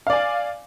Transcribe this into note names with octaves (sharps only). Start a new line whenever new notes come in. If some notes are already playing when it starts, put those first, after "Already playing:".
D5 F5 G#5